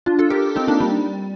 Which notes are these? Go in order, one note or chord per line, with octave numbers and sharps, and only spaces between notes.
D4 F4
F4 A4
G4 A#4
C4 D#4
A#3 D4
G3